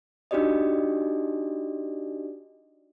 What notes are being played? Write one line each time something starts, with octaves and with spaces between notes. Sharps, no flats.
D4 D#4 F#4 G4 D5 D#5